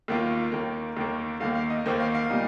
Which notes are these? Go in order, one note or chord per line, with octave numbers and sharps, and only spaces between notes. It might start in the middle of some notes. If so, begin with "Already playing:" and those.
D#2 D#3 A#3 F4
D#2 D#3 A#3
D#2 D#3 A#3
D#2 D#3 A#3 F5
F5
D#5
D#2 D#3 A#3 C5
F5
F5
A#2 G3 D#4